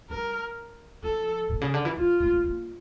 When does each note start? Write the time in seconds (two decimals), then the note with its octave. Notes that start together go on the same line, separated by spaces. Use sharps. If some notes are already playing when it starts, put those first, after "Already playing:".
0.10 G3 A#4
1.03 F3 A4
1.49 A#2
1.61 C#3
1.74 D3
1.85 E3
1.97 E3 F4
2.20 A3
2.32 A#3
2.44 A#3